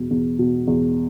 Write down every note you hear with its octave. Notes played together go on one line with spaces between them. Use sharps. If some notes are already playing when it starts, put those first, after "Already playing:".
Already playing: E2 B2
E2
B2
E2